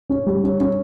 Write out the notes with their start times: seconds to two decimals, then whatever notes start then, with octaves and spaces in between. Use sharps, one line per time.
0.09 C#4
0.26 G3
0.44 C#4
0.60 C#4